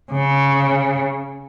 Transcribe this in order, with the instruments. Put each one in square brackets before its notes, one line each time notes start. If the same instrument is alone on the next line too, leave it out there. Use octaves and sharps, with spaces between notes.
[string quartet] C#3